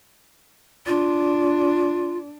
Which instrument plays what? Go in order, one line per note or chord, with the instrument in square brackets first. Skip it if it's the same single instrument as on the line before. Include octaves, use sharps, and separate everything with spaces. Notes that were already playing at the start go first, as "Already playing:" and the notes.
[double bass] D4 [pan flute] F4